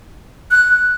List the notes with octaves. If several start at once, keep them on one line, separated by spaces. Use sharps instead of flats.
F#6